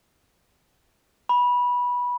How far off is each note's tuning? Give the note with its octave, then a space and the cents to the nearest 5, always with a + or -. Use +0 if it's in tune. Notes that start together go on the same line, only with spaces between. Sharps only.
B5 -15